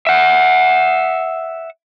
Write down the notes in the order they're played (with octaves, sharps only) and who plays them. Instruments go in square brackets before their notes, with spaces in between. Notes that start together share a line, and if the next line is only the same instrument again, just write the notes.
[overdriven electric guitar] E5 F#5